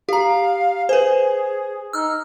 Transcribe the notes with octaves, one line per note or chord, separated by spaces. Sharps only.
G4 F5 A#5
G#4 B4 C5
D#4 E6 F6